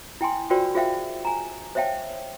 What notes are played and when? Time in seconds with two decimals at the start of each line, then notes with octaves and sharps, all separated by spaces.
0.21 E4 G5 G#5 C6
0.50 F4 F#4 A#4 C5 D5 G5
0.75 F4 G#4 C5 E5 F5 G5
1.25 G#5 A#5
1.75 C5 C#5 E5 F5 G5 A5